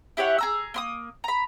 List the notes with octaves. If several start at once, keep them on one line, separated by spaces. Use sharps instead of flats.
E4 G4 C#5 F#5
G#4 A#5 E6
A#3 C6 D#6
A#5 B5